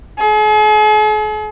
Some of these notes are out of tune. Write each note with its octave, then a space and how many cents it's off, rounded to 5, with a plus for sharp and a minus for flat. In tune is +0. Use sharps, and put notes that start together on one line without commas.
G#4 +45